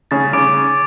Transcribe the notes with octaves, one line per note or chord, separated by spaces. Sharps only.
C#3 A6
C#3 D6 D7